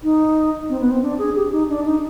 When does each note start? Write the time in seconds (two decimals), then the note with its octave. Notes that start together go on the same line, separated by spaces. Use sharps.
0.03 D#4
0.69 C4
0.80 B3
0.91 C4
1.03 D4
1.19 G#4
1.35 G4
1.52 D#4
1.69 D4
1.85 D#4